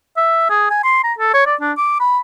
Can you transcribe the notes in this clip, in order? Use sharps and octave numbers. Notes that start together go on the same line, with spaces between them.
E5
G#4
G#5
C6
A#5
A4
C#5
D5
D4
D6
B5